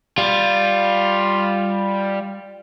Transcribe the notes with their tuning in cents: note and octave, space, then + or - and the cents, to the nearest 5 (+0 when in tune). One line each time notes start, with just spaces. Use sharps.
G3 +5 F4 +0